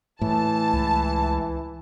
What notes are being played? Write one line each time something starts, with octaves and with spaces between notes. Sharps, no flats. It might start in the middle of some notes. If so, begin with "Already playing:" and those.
A2 E3 A5
C#2